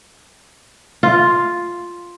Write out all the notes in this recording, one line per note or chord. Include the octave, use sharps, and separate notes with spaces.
F4